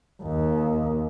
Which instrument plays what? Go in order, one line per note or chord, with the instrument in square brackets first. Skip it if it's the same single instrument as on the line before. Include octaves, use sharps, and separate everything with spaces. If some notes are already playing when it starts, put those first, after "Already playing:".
[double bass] D#2